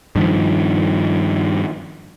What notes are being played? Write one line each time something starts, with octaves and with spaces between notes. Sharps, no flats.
G2 D#3 F3